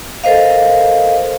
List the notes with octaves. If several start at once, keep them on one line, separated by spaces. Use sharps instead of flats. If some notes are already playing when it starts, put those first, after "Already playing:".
A4 A#4 C5 D#5 F5